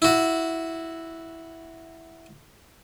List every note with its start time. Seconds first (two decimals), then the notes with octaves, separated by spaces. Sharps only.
0.02 E4 F#4